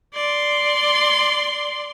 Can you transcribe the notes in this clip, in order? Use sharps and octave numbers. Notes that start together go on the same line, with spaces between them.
D5 C6